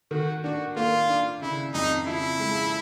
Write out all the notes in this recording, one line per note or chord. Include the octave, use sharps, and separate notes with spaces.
D#3 F#4
D4 F#4
A#3 F4
D4
C#3 E4
F2 D#4
F3 E4
G#3